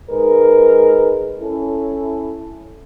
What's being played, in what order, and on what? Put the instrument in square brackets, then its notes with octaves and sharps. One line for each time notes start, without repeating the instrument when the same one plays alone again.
[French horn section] G#2 G#3 D#4 A#4 B4
C#4 E4 A4